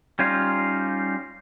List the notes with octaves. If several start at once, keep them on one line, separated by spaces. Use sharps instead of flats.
G3 C#4 D#4 F4